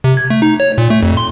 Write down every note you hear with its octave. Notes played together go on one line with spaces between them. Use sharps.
C3
G#6
A3
D#4
C#5
A#2
A3
F2
C6